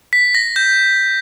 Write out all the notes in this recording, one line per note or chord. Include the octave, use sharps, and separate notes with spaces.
B6
A#6
G6